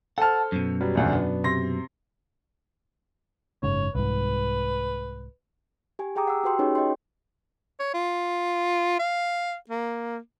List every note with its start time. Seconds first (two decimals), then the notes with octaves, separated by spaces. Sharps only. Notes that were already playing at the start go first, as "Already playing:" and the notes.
0.18 A4 C5 F#5 A5 F6
0.52 F#2 B2
0.81 F#3 G3 B3
0.95 A#1 E2 D3
1.13 B3 D4
1.44 C3 C6 A#6
3.63 F#1 G#2 C#3 C#5
3.95 C2 G#2 B4
5.99 G4 G#5
6.15 G4 G#4 G5 A#5 D6 D#6
6.27 F#5 E6
6.44 F#4 G4 B4 G5 C6 E6
6.59 C#4 D#4 F#4 G#4 B4 C#5
6.75 C#5 D#5 G5 C6
7.80 C#5
7.94 F4
8.99 F5
9.69 A#3